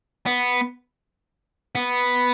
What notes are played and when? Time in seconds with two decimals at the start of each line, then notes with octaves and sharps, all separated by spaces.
0.26 B3
1.75 B3